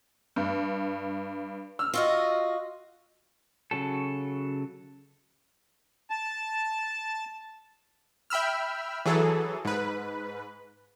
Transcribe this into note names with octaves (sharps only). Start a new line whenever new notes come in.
G2
E6 F6
F4 F#4 D#5
C#3 F#3 A4
A5
E5 G5 B5 E6 F6
E3 F#3 G#4 A4
G#2 B4